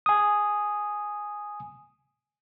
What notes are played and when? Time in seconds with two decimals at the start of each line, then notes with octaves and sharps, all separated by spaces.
0.06 G#5 D#6